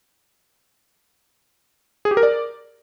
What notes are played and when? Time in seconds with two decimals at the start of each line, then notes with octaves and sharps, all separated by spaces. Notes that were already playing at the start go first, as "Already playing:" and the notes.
2.05 G#4
2.11 G4
2.17 A#4
2.23 D5